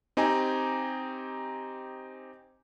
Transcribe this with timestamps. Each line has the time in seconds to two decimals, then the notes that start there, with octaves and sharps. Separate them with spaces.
0.17 C4 D#4 G4 G#5 A#5